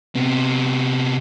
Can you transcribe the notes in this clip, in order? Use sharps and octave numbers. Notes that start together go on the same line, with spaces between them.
C3 B3